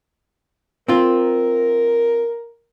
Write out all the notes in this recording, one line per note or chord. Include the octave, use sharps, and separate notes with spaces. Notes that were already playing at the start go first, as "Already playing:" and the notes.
C4 F4 A#4